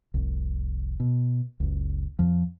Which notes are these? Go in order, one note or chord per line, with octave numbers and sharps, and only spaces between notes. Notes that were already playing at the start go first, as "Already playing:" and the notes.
F1 C2
B2
F#1 C#2
F2 F3